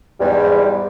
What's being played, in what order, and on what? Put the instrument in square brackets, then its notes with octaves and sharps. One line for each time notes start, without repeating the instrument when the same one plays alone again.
[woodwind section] E2 G#2 G3